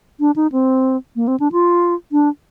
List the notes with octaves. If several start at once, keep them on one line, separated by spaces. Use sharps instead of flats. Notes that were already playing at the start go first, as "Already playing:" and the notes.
D4
D#4
C4
A#3
C4
D4
F4
D4